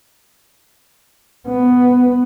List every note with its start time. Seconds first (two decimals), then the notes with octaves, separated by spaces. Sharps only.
1.48 B3